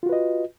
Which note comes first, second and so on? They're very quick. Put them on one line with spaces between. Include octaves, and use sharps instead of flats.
F4 F#4 B4 D#5